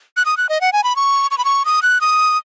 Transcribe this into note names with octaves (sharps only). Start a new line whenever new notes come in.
F#6
D#6
F#6
D#5
F#5
G#5
B5
C#6
C#6
B5
C#6
D#6
F#6
D#6